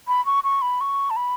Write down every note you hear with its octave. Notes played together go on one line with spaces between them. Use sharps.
B5
C#6
C#6
B5
C#6
A5
B5